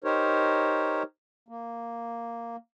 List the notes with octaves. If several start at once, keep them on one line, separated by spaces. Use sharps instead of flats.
D#4 G4 A#4 C5 C#5
A#3